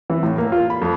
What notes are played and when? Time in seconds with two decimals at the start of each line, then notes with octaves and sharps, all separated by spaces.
0.10 E3
0.23 A2
0.38 A#3
0.52 F4
0.70 B5
0.82 F2